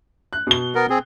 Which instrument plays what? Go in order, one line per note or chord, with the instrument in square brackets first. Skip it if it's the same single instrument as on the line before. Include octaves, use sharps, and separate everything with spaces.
[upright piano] F#6
B2 G7
[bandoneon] B3 A#4
C4 G#4